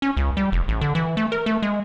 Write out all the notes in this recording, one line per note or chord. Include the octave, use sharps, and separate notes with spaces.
C#4
C#2
G3
F1
A1
D3
E3
A3
A#4
A3
G#3